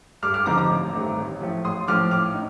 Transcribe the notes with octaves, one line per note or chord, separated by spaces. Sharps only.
G2 D6 F6
D6 F6
D3 F3 C4 D#4 A#5 D6
A#5 D6
A1
G2 D#3 A3 C4
A1
A2 F3 A3
A1 C6 D#6
A2 F3 D6 F6
A2 D6 F6
D#4